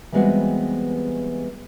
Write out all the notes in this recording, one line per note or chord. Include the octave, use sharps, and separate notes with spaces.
E3 G3 G#3 B3 C4 F#4